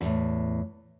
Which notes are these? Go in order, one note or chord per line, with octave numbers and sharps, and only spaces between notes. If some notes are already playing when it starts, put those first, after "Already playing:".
E2 A2